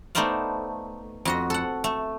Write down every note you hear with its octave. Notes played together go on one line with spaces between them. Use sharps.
A3 B3 D#4 C5 D5 F5
F2 F#4 D#5
A4 F#5
A3